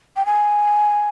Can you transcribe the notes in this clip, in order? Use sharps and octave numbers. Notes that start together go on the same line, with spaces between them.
G5
G#5